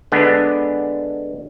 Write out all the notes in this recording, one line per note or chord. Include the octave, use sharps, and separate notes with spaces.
D3 G#3 B3 D4